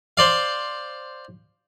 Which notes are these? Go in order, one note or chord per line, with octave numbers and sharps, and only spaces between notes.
C5 D5 F5